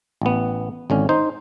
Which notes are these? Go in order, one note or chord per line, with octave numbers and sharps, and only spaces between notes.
A1 B3
G#1 D3 C#4
D#4 C5